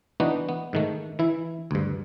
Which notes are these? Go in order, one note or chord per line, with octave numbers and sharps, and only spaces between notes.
E3 B3 D4 D#4 F#4
B3
G#2 D#3 A3
E3 E4
D2 G2